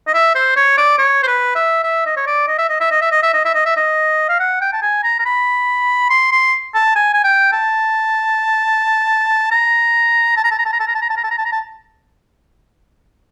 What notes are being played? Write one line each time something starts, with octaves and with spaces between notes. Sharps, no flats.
D#5
E5
C5
C#5
D5
C#5
C5
B4
E5
E5
D#5
C#5
D5
D#5
E5
D#5
E5
D#5
E5
D#5
E5
D#5
E5
D#5
E5
D#5
F5
F#5
G5
A5
G#5
A#5
A#5
B5
C6
C6
A5
G#5
G#5
G5
A5
A#5
A5
A#5
A5
A#5
A5
A#5
A5
A#5
A5
A#5
A5
A#5
A5
A#5
A5
A#5
A5